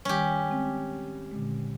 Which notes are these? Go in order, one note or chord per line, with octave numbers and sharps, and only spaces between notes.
D#3 G3 C#4 G4
G#3 C4
A#2 D3 G#3